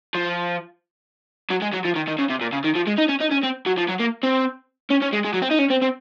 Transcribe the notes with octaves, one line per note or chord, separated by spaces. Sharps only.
F3
F#3
G#3
F#3
F3
D#3
D#3
C#3
C3
A#2
C#3
D#3
F3
G#3
D#4
C#4
D#4
C#4
C4
F#3
F3
F#3
A#3
C4
C#4
C#4
G#3
G#3
F#3
C4
D#4
C#4
C4
C4